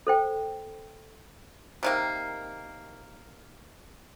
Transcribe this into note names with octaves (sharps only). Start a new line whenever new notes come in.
A4 C5 G5
C3 D#3 A#3